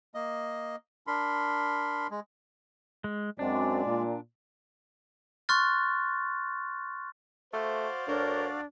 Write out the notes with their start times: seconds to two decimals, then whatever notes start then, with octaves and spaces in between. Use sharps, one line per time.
0.15 A#3 D#5
1.07 D4 A#4 B5 C6
2.11 G#3
3.04 G#3
3.39 F#2 G#3 C4 D4 D5
3.85 A#2
5.49 C6 C#6 F6 F#6 A6
7.53 A3 F#4 C5 D5 F5
8.07 D2 D4 A#4 C5 C#5